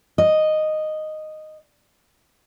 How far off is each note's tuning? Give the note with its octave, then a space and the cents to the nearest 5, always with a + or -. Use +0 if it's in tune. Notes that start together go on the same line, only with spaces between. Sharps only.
D#5 -5